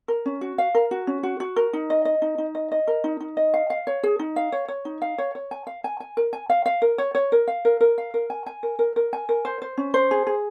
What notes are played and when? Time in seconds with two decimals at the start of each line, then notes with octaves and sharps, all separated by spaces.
0.08 A#4
0.26 C#4
0.41 F#4
0.58 F5
0.75 A#4
0.91 F#4
1.07 C#4
1.23 F#4
1.40 F#4
1.56 A#4
1.73 D#4
1.90 D#5
2.05 D#5
2.22 D#4
2.38 D#4
2.55 D#5
2.72 D#5
2.87 A#4
3.04 D#4
3.20 D#4
3.37 D#5
3.54 F5
3.70 F5
3.87 C#5
4.03 G#4
4.19 D#4
4.36 F5
4.52 C#5
4.68 C#5
4.85 D#4
5.02 F5
5.18 C#5
5.35 C#5
5.51 G#5
5.67 F5
5.84 G#5
6.00 G#5
6.17 A#4
6.33 G#5
6.50 F5
6.66 F5
6.82 A#4
6.98 C#5
7.15 C#5
7.32 A#4
7.48 F5
7.65 A#4
7.81 A#4
7.98 F5
8.14 A#4
8.30 G#5
8.46 G#5
8.63 A#4
8.79 A#4
8.96 A#4
9.13 G#5
9.29 A#4
9.45 C5
9.62 C5
9.77 C#4
9.94 C5
10.11 G#4
10.27 G#4